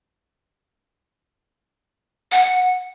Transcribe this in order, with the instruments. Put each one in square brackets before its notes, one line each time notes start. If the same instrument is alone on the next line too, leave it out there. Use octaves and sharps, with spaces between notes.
[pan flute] F#5